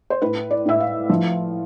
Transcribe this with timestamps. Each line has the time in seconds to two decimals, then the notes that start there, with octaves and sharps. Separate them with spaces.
0.10 C5
0.22 A2 B4
0.51 D5
0.66 A2 E5
0.80 F5
1.09 F3